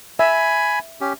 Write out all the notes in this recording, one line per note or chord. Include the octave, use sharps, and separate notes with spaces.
E5 G#5 B5
C#4 G4